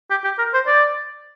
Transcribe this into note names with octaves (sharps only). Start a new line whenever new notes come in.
G4
G4
A#4
C5
D5